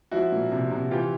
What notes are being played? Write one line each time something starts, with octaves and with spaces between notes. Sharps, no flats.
F3 E4 F#4
A#2
C3
C3
E3 F4 G4